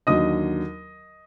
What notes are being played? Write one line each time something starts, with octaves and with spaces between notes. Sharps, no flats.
D#2 D3 F#3 D#5 D#6